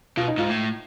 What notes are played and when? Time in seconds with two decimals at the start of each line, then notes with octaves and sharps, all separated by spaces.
0.17 B2 F4
0.28 D#4
0.37 G#2 F4
0.48 A2